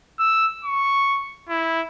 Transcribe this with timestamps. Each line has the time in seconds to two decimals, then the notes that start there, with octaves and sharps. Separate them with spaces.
0.19 E6
0.65 C#6
1.49 E4